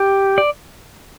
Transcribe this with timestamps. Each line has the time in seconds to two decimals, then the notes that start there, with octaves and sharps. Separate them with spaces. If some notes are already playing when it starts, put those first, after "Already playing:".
Already playing: G4
0.38 D5